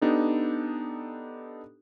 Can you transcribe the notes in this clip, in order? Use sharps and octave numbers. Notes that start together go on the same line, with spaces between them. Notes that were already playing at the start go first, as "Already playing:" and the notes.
B3 D4 D#4 G4 A4